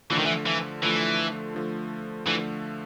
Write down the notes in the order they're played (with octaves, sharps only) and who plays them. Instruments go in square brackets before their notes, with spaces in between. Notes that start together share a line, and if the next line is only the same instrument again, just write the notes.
[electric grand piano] D3 F3 A3 [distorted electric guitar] E3
[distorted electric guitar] D#3
E3
E3
[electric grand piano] D3 F3 A3 [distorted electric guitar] E3
[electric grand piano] D3 F3 A3
[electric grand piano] D3 F3 A3 [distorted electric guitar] E3